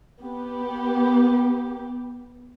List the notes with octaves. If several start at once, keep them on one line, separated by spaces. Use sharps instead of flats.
B3 G4